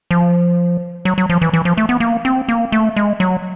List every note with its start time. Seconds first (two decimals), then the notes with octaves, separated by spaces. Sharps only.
0.11 F3
1.05 F#3
1.18 F#3
1.30 F3
1.42 E3
1.53 E3
1.65 F3
1.77 A3
1.89 B3
2.00 A#3
2.25 C4
2.49 A#3
2.72 A3
2.96 G#3
3.20 F#3